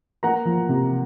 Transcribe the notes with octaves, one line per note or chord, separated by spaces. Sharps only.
A#3 F#5 A#5
F3
C3